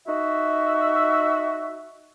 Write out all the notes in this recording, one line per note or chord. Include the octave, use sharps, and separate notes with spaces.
D#4 F#4 E5